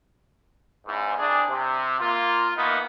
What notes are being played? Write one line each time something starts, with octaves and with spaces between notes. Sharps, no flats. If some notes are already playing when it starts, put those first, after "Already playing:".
E2 G#2
C2 D4 G#4
C3
A#3 F4
E3 A#3 B3 D#4